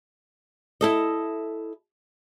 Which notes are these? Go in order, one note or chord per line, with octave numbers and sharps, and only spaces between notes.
E4 A4 D#5